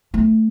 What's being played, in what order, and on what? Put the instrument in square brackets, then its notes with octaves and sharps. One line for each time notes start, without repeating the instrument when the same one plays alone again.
[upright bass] A3